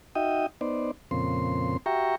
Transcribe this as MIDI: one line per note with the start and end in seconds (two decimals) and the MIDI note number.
0.15 0.46 63
0.15 0.46 66
0.15 0.46 75
0.15 0.46 76
0.15 0.46 79
0.15 0.46 87
0.61 0.91 59
0.61 0.91 63
0.61 0.91 72
0.61 0.91 74
1.11 1.77 41
1.11 1.77 46
1.11 1.77 49
1.11 1.77 60
1.11 1.77 84
1.86 2.15 66
1.86 2.15 67
1.86 2.15 76
1.86 2.15 79
1.86 2.15 82
1.86 2.15 85